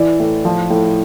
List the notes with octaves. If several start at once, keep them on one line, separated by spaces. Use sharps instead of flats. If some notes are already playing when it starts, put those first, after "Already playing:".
Already playing: E3 D5
A2
F3
A2